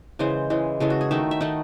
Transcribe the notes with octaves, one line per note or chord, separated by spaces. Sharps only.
C#3 E3 G#3 C5
C#3 E3 G#3
C#3 E3 G#3 A4
F#4
G#4
D#3 A3 D#4 E5
E5
D#3 A3 D#4 F#5